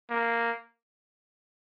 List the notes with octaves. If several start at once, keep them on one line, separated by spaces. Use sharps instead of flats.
A#3